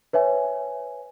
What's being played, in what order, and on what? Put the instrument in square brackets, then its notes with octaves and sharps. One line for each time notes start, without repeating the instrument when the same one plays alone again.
[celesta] B4 C#5 E5 G#5